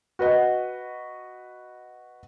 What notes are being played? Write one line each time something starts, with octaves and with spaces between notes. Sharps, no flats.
F#4 B4 D#5 F#5